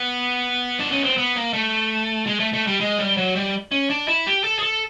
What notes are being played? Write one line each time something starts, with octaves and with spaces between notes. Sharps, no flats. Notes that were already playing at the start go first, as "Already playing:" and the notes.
Already playing: B3
D4
C#4
C4
B3
A#3
A3
G#3
A3
A3
G3
G#3
G3
F#3
G3
C#4
D4
E4
G4
A4
G#4
A4